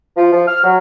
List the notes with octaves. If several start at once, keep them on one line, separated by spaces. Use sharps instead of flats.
F3
F3
F6
F#3